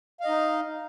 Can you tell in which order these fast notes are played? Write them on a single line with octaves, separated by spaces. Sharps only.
F5 D#5 D#4